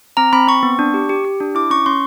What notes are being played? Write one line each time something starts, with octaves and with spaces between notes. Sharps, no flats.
C4 A#5
C4 B5
C4 C#6
B3
D4
G4
G4
G4
D4
E4 D6
C#4 C#6
C#4 C6